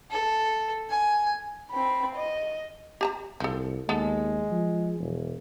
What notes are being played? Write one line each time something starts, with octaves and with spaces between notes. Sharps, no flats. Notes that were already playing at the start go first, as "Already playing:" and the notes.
A4
G#5
C4 B5
D#5
G4 A5 A#5
C2 F3 A4
D#2 G#3 B3 A4
F3
E1